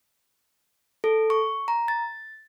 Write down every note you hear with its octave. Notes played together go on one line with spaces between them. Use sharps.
A4
C#6
A#5
A6